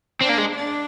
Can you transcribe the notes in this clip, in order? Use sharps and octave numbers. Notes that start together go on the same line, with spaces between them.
C4 D4
A#3
G#3
D4